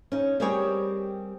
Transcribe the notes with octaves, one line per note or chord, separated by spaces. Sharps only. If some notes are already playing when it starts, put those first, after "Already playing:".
C#4 D#4
G3 C4 G4 G#4 A#4 C#5